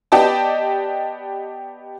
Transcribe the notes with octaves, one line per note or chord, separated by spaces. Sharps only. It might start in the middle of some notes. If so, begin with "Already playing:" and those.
B3 G4 D5 D#5 G5 A5